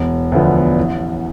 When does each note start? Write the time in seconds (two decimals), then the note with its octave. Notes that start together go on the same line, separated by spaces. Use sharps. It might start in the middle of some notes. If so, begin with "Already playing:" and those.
Already playing: E1
0.32 D2 D3 F3 B3
0.77 A1